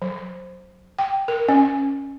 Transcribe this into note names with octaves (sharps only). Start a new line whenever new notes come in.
F#3
G5
A#4
C#4